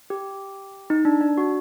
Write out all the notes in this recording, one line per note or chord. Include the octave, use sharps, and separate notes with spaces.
G4
D#4
D4
D4
F#4